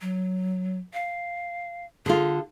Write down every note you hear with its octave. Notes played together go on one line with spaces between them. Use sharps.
F#3
F5
D3 F4 G#4